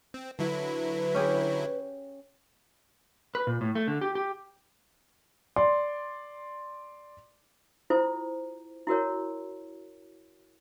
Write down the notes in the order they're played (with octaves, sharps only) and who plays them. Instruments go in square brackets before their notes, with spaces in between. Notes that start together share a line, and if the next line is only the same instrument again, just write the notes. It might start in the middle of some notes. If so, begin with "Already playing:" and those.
[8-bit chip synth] C4
[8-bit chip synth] D3 F#3 E4 [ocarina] B4
[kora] C#4 G4 G#4
[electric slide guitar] B4
A#2
A2
A3
D3
G4
G4
[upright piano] D5 C6
[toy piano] E4 F4 A4 C5
E4 F#4 A#4 C#5